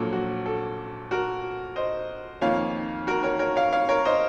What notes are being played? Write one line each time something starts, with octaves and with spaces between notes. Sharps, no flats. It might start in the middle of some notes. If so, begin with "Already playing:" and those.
Already playing: A#1 A#2 F#3 A#3 A4
F#4
A4
F#4 A#4
C5 D#5
F2 D#3 A#3 C#5 F5
F#4 A#4
A#4 C#5
A#4 C#5
C#5 F5
C#5 F5
A#4 C#5
C5 D#5